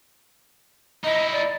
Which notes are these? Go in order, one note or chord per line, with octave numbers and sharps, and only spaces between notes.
D#4 E4 D#5
D5